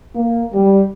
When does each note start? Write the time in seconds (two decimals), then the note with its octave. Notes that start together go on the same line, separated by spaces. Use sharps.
0.15 A#3
0.53 G3